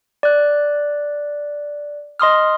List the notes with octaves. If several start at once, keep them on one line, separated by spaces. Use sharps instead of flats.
D5 F#6
D#5 C6 D#6 F6